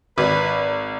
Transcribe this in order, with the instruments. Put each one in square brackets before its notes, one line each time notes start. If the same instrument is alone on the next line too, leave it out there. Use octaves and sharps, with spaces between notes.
[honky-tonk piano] G#1 [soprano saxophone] B4